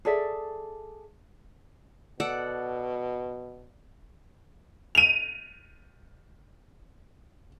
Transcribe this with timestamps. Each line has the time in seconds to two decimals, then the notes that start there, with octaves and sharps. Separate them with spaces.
0.05 G#4 A4 D5 E5
2.20 B2 A4 D5 F#5
4.95 D#7 F7